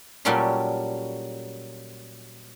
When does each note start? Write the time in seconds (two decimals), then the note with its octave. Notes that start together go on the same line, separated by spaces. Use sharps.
0.25 A#2 F#3 G3 C#4 A4 C6